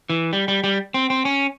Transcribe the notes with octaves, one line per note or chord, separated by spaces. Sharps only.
E3
G3
G3
G3
C4
C4
C#4